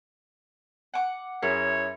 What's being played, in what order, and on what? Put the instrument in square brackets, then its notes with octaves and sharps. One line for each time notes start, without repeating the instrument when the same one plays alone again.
[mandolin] F#5 D6
[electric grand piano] F#2 G#4 A#4 [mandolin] E4 [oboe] C#5